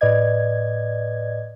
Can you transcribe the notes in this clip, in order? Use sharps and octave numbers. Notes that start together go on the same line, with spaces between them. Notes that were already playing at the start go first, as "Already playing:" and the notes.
A2 B4 D5 D#5 G#6